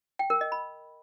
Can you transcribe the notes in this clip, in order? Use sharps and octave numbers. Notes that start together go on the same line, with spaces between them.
G5
A#4
D#5
B5